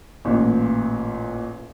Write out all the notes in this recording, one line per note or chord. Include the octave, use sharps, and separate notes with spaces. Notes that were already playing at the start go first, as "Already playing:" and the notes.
A1 A#2